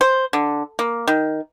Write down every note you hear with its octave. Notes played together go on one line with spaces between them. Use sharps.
C5
D3
A#3
D#3